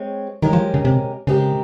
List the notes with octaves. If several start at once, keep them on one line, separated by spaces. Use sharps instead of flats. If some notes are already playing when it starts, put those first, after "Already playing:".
Already playing: G#3 C4 C#5
D#3 G#3 C#4 G4 A#4
F3
C#3
C3
C#3 G#3 C4 G4 A#4